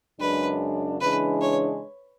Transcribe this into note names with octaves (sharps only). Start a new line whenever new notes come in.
F#2 C#3 G#3 D4 B4
C#3 E3 G#3 D4 B4
C#5